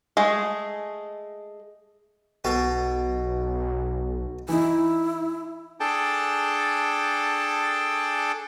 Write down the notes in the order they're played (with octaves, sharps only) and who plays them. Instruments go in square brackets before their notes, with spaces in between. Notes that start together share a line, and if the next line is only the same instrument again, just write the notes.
[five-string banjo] G#3 A3 G#4
[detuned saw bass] B1 [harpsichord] B2 A4
[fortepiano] E3 D#4 [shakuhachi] E4
[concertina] D4 G#4 A4 G5 A5